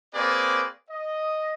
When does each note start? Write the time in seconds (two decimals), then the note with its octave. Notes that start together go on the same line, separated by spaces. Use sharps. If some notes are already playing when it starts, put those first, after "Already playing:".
0.14 A#3 C4 G#4 B4 C#5 D5
0.90 D#5